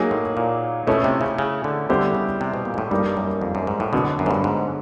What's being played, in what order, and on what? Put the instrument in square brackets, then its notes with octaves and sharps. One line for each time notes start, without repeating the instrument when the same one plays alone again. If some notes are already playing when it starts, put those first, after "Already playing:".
Already playing: [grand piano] F#3 A#3 D#4 G#4
[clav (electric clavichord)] A2
A#2
[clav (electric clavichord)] B2 [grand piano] A3 C#4 E4
[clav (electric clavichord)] C3
C#3
C#3
D3
[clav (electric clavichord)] D3 [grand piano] G3 B3 E4 G4 C5
[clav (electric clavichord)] C#3
C3
B2
A#2
G#2
A2
[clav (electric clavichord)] G2 [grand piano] G3 A#3 D#4
[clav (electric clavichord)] G2
F#2
F2
F#2
G#2
A2
[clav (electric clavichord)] B2 [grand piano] D3 F#3 B3
[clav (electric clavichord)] F#2
G#2
G2
G#2